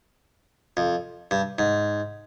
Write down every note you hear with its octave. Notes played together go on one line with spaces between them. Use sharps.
F2
G2
G#2